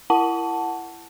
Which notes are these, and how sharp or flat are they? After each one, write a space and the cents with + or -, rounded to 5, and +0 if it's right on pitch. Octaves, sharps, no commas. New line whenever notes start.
E4 +30 F#5 +0 A5 +0